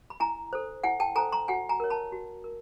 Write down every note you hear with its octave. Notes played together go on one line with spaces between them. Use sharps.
B5
E4 G#5 A#5
A4 C5
E4 F#5 G#5
G5 A5
A4 C5 G#5 A#5
A#5 C6
F#4 F#5 G#5
G#5 A#5
A#4 C#5
A5 B5
F#4
A#4